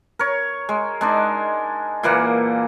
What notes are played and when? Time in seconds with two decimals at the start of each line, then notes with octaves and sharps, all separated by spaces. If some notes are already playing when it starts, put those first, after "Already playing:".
0.19 A#4 C#5
0.69 G#3
1.01 G#3 D4 D#4
2.03 A#2 E3 A#3 F#5